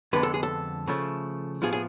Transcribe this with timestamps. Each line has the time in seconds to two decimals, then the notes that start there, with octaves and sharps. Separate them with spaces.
0.13 F2 D3 G#3 B3 B4
0.23 A4
0.34 G#4
0.43 A4
0.88 C#3 F3 A3
1.62 A2 F3 B3 F4 G#4
1.73 G#4